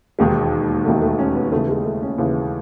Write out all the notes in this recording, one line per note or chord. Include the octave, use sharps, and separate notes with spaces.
E1 D#2 D#3 G#3
E1 D#2 D#3 A3
A3
C#4
B3
D#2 C#3 E3 A3
G#3
A3
C#4
D#2 C#3 E3 E4